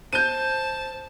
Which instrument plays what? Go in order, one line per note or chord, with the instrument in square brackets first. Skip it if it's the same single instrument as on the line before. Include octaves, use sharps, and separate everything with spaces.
[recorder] C5 [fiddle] A5 [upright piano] G6 D#7